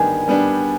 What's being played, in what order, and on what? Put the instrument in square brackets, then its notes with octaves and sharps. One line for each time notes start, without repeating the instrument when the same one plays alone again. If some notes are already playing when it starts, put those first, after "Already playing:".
Already playing: [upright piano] D#3 G3 B3 D4 [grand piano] G#5
[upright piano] G3 B3 D4